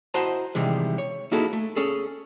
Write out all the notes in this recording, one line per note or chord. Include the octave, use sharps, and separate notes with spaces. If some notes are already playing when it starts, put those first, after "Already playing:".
E4 F#4 C5 D#5 A5 A#5
C3 D#3 E3 G3 G#3
C#5
A#3 D#4 E4 F#4 G#4 A4
A3
C#4 G#4 A4